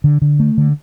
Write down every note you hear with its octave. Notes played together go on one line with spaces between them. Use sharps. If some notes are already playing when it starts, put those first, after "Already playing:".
D3
D3
A3
D3